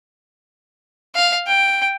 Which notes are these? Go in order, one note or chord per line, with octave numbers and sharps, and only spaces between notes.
F5
G5